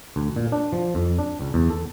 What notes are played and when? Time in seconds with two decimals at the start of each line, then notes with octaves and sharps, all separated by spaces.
0.16 D2
0.36 A#2
0.52 D4
0.73 F3
0.95 F2
1.18 D4
1.41 C#2
1.54 E2
1.70 A4